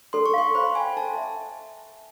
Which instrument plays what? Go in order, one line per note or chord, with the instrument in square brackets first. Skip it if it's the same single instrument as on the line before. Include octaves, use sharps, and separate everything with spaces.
[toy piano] A4 [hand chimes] C6
[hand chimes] C#6
[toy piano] F5 [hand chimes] C6
[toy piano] C5 [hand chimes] B5
[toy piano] G5 [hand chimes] G#5
[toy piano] A4 [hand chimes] A5
[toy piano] E5